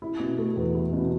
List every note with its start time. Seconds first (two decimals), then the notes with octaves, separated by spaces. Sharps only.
0.02 E4
0.19 B2
0.38 A3
0.56 E2
0.75 E4
0.93 B2